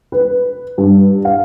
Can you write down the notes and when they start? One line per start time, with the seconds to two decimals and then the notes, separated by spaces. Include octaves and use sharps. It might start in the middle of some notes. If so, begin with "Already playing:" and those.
0.12 B4
0.78 G2
1.25 F5